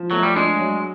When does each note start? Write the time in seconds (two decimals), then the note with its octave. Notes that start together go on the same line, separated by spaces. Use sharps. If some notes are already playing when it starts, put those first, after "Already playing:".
Already playing: F3
0.11 F#3 A3
0.23 G3
0.36 G#3 D4
0.59 F#3